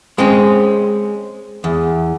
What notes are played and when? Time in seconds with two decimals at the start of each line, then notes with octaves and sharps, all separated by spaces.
0.18 G#3 C4 C#4
1.64 E2